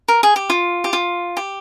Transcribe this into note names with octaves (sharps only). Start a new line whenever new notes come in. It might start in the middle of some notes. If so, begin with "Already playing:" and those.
A#4
G#4
G4
F4
G4
F4
G4